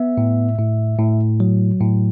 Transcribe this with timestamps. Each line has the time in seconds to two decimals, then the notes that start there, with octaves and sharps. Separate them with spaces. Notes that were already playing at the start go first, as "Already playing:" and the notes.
Already playing: B3 E5
0.18 A2
0.58 A2
0.99 A2
1.40 F#3
1.80 A2